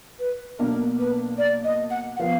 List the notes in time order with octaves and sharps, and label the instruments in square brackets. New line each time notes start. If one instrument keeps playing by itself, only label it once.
[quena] B4
[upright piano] B1 B2 A#3 D4 [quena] A#4
[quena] B4
D5
D#5
F#5
F#5
[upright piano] F3 B3 [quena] F5